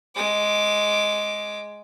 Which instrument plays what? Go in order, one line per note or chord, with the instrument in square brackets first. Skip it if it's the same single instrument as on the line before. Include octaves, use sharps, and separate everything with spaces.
[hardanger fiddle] G#3 D6